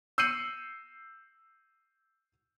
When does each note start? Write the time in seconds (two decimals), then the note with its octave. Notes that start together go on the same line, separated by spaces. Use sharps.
0.18 E6 G6 C7 C#7 D#7 F#7